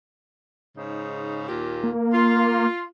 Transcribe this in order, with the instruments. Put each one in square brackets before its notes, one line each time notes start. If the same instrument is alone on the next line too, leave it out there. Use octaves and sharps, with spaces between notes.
[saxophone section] G#2 C#3 D#4
D#2 A#2 G4
[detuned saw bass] A#3
[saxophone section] F4